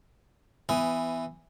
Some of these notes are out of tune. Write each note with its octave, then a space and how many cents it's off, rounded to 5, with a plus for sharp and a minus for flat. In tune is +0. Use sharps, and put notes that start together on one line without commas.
E3 +0 B3 +20 G#5 +0